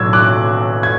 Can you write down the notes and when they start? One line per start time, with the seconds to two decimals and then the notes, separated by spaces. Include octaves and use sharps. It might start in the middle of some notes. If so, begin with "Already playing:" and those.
Already playing: B1 A2 F#3 E6 G#6
0.13 D6 F#6
0.83 G#6